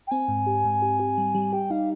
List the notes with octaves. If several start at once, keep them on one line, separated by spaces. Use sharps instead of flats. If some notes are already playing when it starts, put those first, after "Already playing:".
G5
C4 G#5
G#2
G4
G#2
G4
G4
G3
G3
G4 G5
D#4 F5